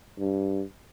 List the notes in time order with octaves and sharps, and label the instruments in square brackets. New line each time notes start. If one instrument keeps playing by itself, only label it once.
[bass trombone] G2